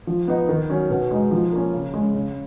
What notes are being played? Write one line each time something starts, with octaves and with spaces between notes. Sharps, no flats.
F3
B3 D#4
D#3
F#3 C#4
B2
G#3 D#4
F3
A#3 C#4
C#3
G#3 C#4
C#3